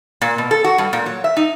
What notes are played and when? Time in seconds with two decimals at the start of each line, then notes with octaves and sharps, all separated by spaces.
0.21 A#2
0.38 B2
0.51 A4
0.64 F#4
0.78 G2
0.93 A#2
1.06 F#3
1.24 E5
1.37 D#4